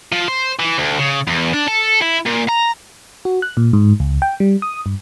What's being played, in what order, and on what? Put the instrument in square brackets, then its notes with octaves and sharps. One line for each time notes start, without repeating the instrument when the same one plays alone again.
[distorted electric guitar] F3
C5
E3
D2
C#3
E2
D4
A4
E4
A#2
A#5
[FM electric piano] F#4
F#6
A#2
G#2
C#2
G5
G3
D#6
G2